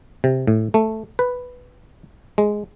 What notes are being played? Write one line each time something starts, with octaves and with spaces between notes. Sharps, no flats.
C3
A2
A3
B4
G#3